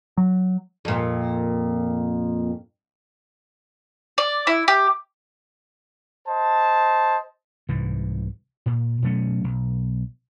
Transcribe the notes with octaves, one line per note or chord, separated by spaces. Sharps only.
F#3
F2 A#2
D5
E4
G4
C5 D#5 A5
C2 G#2 E3
A#2
B2 F#3 A3 C#4
B1